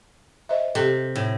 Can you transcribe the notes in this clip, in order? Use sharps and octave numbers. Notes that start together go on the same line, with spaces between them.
C5 D#5 E5
C3 G4 A4
A2